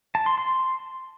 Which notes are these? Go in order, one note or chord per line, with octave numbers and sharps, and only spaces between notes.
A5
C6
C6